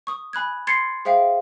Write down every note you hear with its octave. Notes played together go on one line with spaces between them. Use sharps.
C#6 D#6
G#5 B5 F#6 G#6
C6 G#6 A6 C7 C#7
G#4 C5 E5 F5 G5